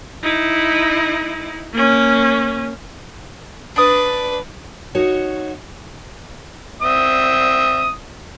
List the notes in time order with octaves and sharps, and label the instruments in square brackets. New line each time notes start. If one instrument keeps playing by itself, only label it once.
[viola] D#4 E4
A#3 C#4
[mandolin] D4 D#6 [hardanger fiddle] B4
[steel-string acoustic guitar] D#4 F#4 C#5
[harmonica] C4 E5 D#6